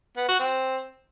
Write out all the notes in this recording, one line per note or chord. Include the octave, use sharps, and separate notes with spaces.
B3
F#4
C4